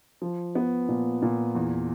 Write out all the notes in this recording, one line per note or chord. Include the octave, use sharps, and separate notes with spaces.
F3
B3
A#2
A#2
E2